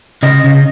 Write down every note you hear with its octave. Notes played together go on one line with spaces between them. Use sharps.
C#3 D#5
C#3